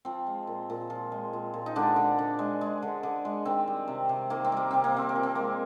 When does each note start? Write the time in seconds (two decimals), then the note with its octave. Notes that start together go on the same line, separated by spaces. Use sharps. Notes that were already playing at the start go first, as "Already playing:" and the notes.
0.05 F3 C4
0.27 G#3
0.47 A#2
0.70 A#2
0.90 F3
1.12 G#3
1.33 A#2
1.54 A#2
1.66 D#4
1.75 D3 G#3 D4
1.96 D3
2.18 D3
2.39 G#3
2.61 G#3
2.82 D3
3.03 D3
3.25 G#3
3.45 D#3 C4
3.68 G3
3.88 C3
4.09 C3
4.30 D#3 A#3
4.45 C4
4.52 G3 A#3
4.71 C3 C4
4.84 A#3
4.94 C3 C4
5.09 A#3
5.16 F3
5.23 C4
5.35 G#3 A#3